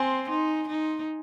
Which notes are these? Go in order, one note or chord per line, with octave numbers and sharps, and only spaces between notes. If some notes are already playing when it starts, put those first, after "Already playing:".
Already playing: C4 G#5 C6
D#4
D#4